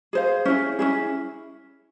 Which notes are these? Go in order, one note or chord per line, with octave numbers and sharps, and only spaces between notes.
G#4 C5 F5
C#4 E4 G#4
C#4 E4 G#4